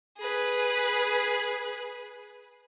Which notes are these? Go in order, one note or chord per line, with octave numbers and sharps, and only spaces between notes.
G#4 B4